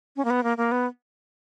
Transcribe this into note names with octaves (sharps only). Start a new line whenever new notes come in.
C#4
A#3
B3
A#3
A#3
B3